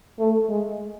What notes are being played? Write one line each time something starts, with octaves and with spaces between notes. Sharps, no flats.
A3
G#3